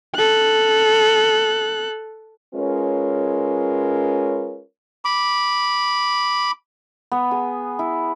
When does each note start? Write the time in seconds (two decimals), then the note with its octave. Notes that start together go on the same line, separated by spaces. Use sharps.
0.16 A4 F#6
2.54 G#3 C#4 F4 A#4 B4 C#5
5.05 B5 D6
7.12 B3
7.31 G#4
7.79 E4